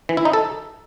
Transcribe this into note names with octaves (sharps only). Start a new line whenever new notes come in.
E3
E4
D#4
A4